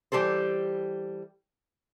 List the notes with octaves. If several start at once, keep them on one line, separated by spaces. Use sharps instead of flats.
E3 G3 G4 A4 C5